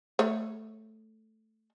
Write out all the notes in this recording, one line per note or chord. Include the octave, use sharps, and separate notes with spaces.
A3 C#5